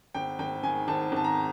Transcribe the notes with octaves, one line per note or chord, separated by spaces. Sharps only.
G#1 G5
G#1 G5
D#3 G#5
G#1 A5
G#1 A5
A#5